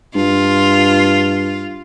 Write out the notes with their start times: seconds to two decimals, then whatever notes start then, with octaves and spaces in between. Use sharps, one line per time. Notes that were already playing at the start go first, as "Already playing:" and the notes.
0.15 G2 F4